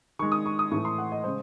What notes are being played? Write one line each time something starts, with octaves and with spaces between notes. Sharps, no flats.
D#3 G#3 C#6
D#6
C#6
D#6
A2 E3 A3 C#6
C6
F#5
D#5
C#3 G#3 C5